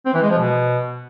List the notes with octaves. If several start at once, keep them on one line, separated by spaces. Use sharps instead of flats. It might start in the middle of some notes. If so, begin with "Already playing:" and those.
C4
E3
G#3
F3
B2